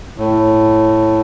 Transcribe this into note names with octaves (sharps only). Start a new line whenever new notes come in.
A2